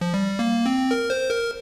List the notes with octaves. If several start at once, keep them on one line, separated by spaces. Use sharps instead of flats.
F3
G3
A#3
C4
A#4
C5
A#4